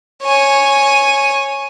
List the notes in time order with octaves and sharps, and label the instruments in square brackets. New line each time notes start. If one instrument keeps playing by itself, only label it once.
[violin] C#5 G#5